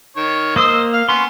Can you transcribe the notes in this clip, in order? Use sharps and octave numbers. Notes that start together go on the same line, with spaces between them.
D#3 C#5
A#3 C5 D#5 D#6 E6
F5
B3 C#4 C6